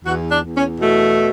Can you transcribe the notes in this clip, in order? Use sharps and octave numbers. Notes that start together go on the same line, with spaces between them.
E2 F#4
D4
E2
C#4
B2 A3